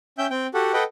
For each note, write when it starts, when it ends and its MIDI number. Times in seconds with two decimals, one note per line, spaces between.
0.18 0.27 61
0.18 0.27 76
0.18 0.27 79
0.18 0.27 91
0.30 0.47 60
0.30 0.47 79
0.54 0.73 66
0.54 0.73 67
0.54 0.73 69
0.54 0.73 78
0.73 0.84 69
0.73 0.84 71
0.73 0.84 75
0.73 0.84 78
0.73 0.84 79